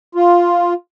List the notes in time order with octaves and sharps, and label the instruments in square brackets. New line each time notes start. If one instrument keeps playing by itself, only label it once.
[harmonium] F4